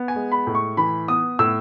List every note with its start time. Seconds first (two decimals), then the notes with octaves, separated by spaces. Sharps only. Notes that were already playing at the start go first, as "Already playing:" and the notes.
Already playing: B3
0.08 G#5
0.16 G#3
0.32 B5
0.47 A2
0.55 C#6
0.77 E3 B5
1.08 B3 D#6
1.39 A2 E6